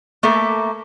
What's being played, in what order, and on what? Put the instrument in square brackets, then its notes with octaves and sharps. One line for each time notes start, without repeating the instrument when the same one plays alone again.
[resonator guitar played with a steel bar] A3 A#3 A4 E5